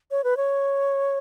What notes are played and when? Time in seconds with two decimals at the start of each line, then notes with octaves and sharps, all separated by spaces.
0.11 C#5
0.24 B4
0.37 C#5